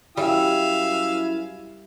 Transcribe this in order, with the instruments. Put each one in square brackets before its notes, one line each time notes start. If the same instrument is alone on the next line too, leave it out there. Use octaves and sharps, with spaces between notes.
[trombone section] F#2 E4 [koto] G3 [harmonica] E5 F5 G#5